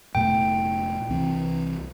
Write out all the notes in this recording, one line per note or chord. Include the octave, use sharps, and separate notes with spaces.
F1 A#2 A3 G5
C2 E3 C4